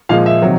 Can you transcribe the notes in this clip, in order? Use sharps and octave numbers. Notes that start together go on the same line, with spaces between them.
A#2 F3 G#3 F5
E5
C3 D#3 F#3